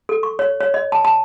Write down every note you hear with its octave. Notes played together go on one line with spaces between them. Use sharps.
A4
C#6
C#5
C#5
D#5
A5
A5